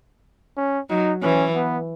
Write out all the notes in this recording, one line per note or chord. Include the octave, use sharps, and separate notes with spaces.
C#4
F#3 D#4
E3 C#4
B3